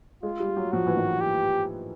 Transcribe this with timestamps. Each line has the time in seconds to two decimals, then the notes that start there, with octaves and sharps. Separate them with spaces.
0.23 G#3 F4
0.40 G3
0.57 F#3
0.72 F3 F#4
0.87 E3
0.96 D#3
1.21 G4